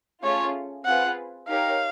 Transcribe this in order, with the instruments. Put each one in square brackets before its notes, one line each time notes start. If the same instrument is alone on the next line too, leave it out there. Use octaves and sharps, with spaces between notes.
[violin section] A3 C#4 F4 G#4 [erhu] C#5
[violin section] C4 F4 G#4 B4 [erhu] F#5
[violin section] D#4 G4 A#4 C#5 [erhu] F5